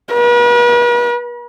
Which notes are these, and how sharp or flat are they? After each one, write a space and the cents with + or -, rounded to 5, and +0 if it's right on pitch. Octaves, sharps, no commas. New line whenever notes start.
B4 -45